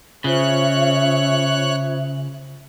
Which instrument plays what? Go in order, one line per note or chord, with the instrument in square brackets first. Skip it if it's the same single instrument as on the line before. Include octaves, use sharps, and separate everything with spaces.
[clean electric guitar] C#3 [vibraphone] F4 C5 [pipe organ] C#5 F#6 [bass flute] E5